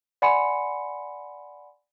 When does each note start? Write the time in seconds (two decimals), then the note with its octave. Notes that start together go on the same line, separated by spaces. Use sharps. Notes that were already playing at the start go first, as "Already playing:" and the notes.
0.22 D5 F#5 G#5 B5 C6 C#7